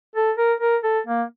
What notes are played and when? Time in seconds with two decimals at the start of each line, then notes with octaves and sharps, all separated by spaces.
0.15 A4
0.38 A#4
0.60 A#4
0.83 A4
1.07 A#3